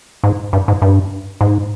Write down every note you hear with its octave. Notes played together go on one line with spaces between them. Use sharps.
G#2
G2
G#2
G2
G#2